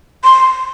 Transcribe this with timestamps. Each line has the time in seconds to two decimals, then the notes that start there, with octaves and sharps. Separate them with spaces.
0.24 C6